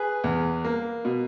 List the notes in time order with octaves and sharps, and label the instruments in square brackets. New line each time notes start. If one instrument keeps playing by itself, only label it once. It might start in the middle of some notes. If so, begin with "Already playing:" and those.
Already playing: [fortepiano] G#4 B4
E2
A#3
B2